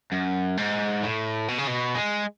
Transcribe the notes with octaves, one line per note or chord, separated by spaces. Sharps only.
F#2
G#2
A2
B2
C#3
B2
G#3